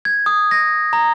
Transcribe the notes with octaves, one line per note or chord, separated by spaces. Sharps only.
G#6
D#6
A#6
A#5